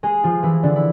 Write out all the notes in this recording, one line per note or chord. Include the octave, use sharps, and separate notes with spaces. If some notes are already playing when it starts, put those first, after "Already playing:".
G#3 G#4
F3 F4
E3 E4
D3 D4
E4